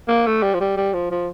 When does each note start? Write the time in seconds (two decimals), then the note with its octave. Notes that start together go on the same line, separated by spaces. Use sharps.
0.08 A#3
0.26 A3
0.42 G3
0.54 F3
0.60 G3
0.77 G3
0.94 F3
1.11 F3